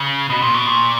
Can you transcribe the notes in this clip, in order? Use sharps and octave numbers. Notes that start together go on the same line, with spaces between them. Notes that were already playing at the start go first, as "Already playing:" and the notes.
Already playing: C#3
B2
A#2
B2
A#2